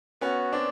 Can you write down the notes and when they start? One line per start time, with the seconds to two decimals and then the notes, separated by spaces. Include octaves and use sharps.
0.21 B3 C#4 F#4
0.52 C4 D4 D5